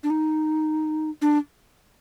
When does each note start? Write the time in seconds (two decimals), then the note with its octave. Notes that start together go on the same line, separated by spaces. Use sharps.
0.03 D4
0.10 D#4
1.22 D4